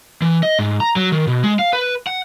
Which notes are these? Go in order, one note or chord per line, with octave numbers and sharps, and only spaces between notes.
E3
D#5
G#2
A#5
F#3
D#3
B2
G#3
F5
B4
F#5